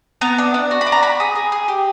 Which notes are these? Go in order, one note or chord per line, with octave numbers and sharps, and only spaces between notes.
B3 A#5
D4
D4
F#4
B5
D4
A#5
F#4 B5
G#4
G#4
G#4
G4